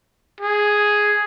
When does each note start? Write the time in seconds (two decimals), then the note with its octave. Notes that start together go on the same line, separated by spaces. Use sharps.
0.40 G#4